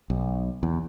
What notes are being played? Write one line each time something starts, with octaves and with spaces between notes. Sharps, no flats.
B1
E2